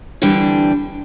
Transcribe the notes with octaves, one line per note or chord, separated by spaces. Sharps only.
D3 E3 G3 C4 D4 G4